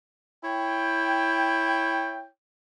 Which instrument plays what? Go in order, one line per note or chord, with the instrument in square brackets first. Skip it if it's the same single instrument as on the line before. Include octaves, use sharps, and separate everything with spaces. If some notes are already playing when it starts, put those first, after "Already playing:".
[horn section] E4 C#5 G5